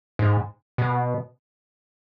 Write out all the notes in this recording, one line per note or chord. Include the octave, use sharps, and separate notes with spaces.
G#2
B2